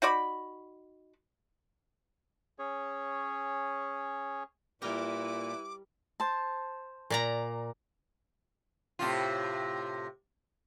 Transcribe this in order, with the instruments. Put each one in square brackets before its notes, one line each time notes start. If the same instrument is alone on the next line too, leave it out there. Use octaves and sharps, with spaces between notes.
[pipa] D#4 F#4 D5 B5
[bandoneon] C#4 G#4 C#5
[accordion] A#2 [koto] G3 A#4 G5 [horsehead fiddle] E4 B4 [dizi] D6
[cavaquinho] C5 A5
[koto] A#2 D5 A#5
[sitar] A2 C3 F4